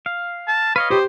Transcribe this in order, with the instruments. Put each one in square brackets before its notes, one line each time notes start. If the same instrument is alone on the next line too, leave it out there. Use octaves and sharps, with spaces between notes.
[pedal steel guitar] F5
[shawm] A5
[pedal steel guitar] B4 C#5 D#5 [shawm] F5
[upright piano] G4 [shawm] C5